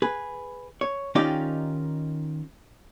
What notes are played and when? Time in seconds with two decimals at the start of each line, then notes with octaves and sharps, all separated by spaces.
0.02 G#4 B4
0.81 C#5
1.15 D#3 C#4 D#4 F4 G4 D5